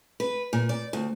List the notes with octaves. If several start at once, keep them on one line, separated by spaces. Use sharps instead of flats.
B4
A#2
D5
D2